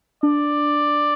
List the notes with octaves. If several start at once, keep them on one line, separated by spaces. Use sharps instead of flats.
D4 D5